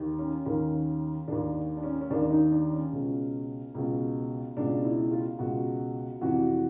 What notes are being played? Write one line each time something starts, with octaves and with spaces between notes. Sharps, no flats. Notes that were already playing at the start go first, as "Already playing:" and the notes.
Already playing: D#2 D#3
C#4
D#2 D#3 C#4
D#2 D#3 D4
D4
C#4
C#4
D#2 D#3 D4
D4
D#4
D4
C#4
C#2 B2
C#2 B2
C#2 B2 D4
E4
F4
C#2 B2 F#4
F2 C3 E3 F#4